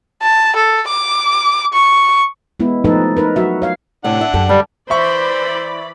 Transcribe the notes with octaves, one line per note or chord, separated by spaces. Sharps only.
A5
A4
D6
C#6
G#3 B3 E4
F3 A3 C4 D#4 A4 B4
D#4 A#4 B4
F#3 F#4 E5
C#5 F5
A2 C3 D4 F#5
E5
F#2 G4 A4
D3 G3
E3 C5 D5 E5 B5 C#6